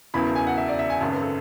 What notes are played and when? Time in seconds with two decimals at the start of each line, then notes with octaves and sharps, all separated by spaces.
0.14 E1 E2 C#3 E3 B5
0.35 G#5
0.47 F#5
0.58 E5
0.68 D5
0.79 E5
0.90 G#5
1.01 G#1 F#2 C#3 A5
1.12 B4
1.22 A4